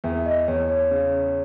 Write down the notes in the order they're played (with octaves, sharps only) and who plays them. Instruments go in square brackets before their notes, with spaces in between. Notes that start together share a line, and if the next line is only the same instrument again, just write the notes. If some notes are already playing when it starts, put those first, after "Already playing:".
[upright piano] E2 [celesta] E5
[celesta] D#5
[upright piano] E2 [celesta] C#5
[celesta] C#5
[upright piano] C#3